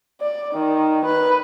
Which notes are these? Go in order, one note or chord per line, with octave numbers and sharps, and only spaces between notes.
D5
D#3
B4